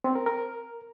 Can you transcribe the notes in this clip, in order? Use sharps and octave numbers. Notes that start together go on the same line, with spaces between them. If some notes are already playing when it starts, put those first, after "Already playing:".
C4
A#4
A#4